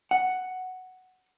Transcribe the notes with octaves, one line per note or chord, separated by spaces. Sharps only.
F#5